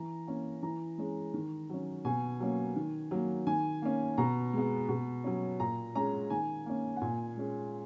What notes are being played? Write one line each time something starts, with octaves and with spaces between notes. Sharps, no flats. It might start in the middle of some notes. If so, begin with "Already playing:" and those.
Already playing: E3 A#5
A#3 C#4
E3 A#5
G#3 C#4
D#3
F#3 C#4
B2 G#5
F#3 A#3 C#4
D#3
F#3 A#3
D#3 G#5
A#3 C#4
B2 A#5
G#3 B3
B2
F#3 C#4
A#2 A#5
G#3 C#4 A#5
D#3 G#5
A#3 C#4
F#5
A#2 G#5
G#3 C#4